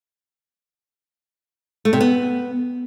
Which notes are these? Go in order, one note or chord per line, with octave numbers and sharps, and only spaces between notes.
A3
C3
B3